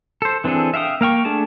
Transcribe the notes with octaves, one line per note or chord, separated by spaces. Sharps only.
A4 C5
E3 C4 D4 G#4 A4
E5 F5 G5 D#6
A#3 F5 G5 C#6
A3 D4 G#4 A5